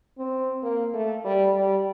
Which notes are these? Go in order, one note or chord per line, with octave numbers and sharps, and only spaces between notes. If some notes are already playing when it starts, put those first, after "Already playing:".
C4
A#3
A3
G3
G3